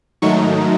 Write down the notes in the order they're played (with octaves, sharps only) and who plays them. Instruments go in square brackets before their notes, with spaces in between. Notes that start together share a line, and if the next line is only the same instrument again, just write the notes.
[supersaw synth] G#2 D#3 F#3 A3 D#4 C#6